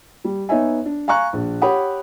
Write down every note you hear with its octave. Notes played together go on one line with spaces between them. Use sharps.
G3
B3 D#4 C#5 E5 G#5
D4
F5 G#5 A#5 C#6 F#6
A#1
G4 C#5 F#5 B5 D#6